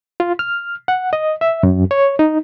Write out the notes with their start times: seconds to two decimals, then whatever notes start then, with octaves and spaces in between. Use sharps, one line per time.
0.20 F4
0.39 F6
0.88 F#5
1.13 D#5
1.41 E5
1.63 F#2
1.91 C#5
2.19 D#4